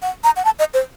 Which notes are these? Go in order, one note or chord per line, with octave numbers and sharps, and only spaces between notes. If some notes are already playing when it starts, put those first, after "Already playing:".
F#5
A#5
F#5
A5
D#5
C5